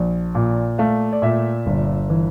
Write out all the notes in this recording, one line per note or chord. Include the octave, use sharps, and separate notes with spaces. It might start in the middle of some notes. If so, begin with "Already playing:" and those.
Already playing: A#1
A#2
A3 F5
D5
A#2 E5
G1
E3